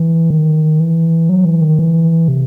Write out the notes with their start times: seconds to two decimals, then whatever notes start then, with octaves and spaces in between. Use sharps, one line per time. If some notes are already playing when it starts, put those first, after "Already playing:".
Already playing: E3
0.30 D#3
0.80 E3
1.29 F#3
1.45 E3
1.62 D#3
1.79 E3
2.28 C3